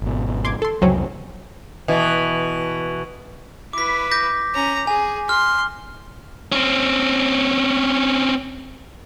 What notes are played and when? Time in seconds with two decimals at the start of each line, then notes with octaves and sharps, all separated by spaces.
0.02 G#1 B2
0.45 C6 D6 G#6
0.62 A4 C6
0.82 C2 F2 C#3 F#3 C4 C#4
1.88 B2 E3
3.73 E4 B4 D6 B6
4.12 D6 G6 A#6
4.54 C#4 A#5
4.87 G#4 G#5
5.29 C6 F6
6.52 C4 C#4